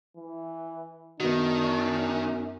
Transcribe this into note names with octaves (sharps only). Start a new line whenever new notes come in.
E3
F#2 D#3 B3 D4 F#4